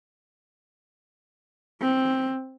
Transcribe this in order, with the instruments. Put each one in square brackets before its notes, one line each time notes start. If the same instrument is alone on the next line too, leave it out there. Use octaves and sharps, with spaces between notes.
[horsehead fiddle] C4